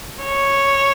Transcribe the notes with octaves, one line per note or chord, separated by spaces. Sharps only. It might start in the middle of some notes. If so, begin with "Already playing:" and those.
C#5